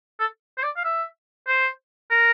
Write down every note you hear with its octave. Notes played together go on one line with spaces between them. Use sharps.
A4
C5
D5
F5
E5
C5
A#4